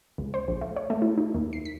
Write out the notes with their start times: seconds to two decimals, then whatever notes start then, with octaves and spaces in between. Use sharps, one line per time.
0.18 C#2
0.34 C5
0.48 A#1
0.61 A3
0.76 C#5
0.90 A3
1.02 E4
1.18 D#4
1.34 D#2
1.53 C7
1.65 B6